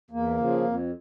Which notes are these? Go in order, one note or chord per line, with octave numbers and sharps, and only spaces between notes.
E2 A#3
C#3 F3
F2